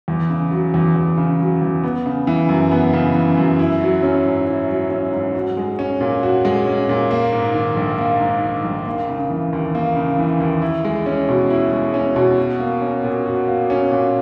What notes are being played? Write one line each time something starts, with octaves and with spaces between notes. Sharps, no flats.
E2
C#3
F#3
E2
E2
C#3
F#3
E2
B3
C#3
E3
F#2
B3
C#3
E3
F#2
E4
F#3
C#4
G#2
E4
F#3
C#4
G#2
F#4
G#3
C#4
A#2
F#4
G#3
C#4
A#2
A#3
G#2
D#3
A#1
A#3
G#2
D#3
A#1
A#3
C#3
E3
D#2
A#3
C#3
E3
D#2
E4
G#3
C#4
B2
E4
G#3
C#4
B2
F#4
A#3
C#4
A#2
F#4
A#3
C#4
A#2